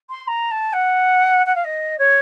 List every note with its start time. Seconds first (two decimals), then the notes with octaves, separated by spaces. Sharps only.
0.10 C6
0.28 A#5
0.51 A5
0.73 F#5
1.46 F#5
1.55 F5
1.64 D#5
1.98 C#5